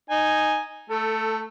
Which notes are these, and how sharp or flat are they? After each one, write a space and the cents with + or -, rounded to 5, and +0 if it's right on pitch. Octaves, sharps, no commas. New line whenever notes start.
D#4 -5 G#5 +0
A3 +0 A4 +20